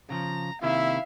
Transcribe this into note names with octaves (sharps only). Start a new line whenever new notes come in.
C#3 E3 F3 A#5
C3 D#3 A#3 E4 E5 F5